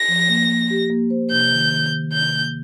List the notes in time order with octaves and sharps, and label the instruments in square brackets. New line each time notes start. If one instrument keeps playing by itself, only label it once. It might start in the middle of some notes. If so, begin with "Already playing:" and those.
Already playing: [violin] A#6
[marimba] F3
A#3
A#3
G4
A#3
C5
[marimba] C3 [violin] G6
[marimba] D#3
D#3
D#3
[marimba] C3 [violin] G6
[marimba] A#3